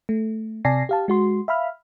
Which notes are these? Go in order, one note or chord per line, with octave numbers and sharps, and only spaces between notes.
A3
C3 D5 G#5 A5 A#6 C7
G4 F5 A5
G#3 F#4 C6
E5 F5 B5 F6